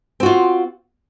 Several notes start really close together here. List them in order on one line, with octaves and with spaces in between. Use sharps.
C4 F#4 F4